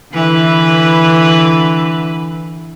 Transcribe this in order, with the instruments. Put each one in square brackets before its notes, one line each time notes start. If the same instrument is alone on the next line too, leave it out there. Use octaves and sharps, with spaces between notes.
[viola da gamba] D3 E3 B4